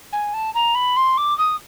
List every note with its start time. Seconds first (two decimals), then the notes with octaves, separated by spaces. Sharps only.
0.13 G#5
0.34 A5
0.54 A#5
0.75 B5
0.97 C6
1.17 D6
1.38 D#6